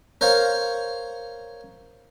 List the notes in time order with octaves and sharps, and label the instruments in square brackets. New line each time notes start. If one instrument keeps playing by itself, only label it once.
[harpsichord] A#4 C5 C#5 F5